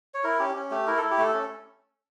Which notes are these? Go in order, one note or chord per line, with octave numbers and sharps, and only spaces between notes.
C#5
E4 A#4
C#4 G4
C#4
A3 G4
E4 A#4
E4 A4
G4
A3 A4
C#4